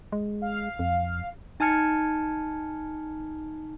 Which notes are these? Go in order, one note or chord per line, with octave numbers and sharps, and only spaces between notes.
G#3
F5
F2
D#4 G#5 A5 F6 G#6 C#7